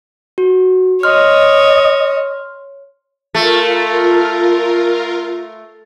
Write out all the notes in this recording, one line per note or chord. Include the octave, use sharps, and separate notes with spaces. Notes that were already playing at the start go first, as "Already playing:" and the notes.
F#4
C#5 D#5 C6 F6
A3 F4 A#4